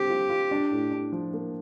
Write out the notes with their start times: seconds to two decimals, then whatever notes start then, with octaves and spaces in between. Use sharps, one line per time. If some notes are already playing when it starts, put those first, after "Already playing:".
Already playing: D3 G3 C4 G4
0.10 F4
0.30 F4
0.51 D4
0.71 A2
0.91 D4
1.12 F3
1.33 A#3